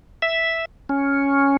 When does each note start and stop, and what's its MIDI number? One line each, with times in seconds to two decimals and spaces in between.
0.22 0.65 76
0.89 1.57 61